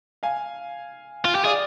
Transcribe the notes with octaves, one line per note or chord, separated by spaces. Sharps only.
F5 G#5
F4
G4
G#4 D5 F5